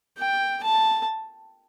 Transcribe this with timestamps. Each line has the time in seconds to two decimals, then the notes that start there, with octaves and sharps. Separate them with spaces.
0.18 G5
0.64 A5